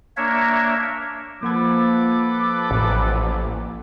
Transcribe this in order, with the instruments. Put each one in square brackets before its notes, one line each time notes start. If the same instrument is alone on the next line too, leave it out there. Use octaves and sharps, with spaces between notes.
[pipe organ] A#3 D4 A#4 C#5 E5
[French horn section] F3 [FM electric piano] A#3 F#5 G#6 [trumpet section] A4 B4 D6
[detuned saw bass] A1